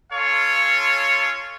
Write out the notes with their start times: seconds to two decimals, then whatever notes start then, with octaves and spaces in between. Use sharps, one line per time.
0.12 C#4 F4 A4 C#5 F5